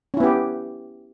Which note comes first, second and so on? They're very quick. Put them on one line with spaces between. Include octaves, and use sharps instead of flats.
C#4 E4 B3 G4